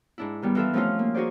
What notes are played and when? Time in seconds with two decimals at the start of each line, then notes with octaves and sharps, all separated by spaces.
0.18 G#2 D4 E4
0.42 D#3 G3 B3
0.55 E3 D#4 F4 A4 E5
0.73 F3 A3 C4 C#4 D#4 F4
0.99 A#3
1.14 D#4 F#4 G#4 C5 D5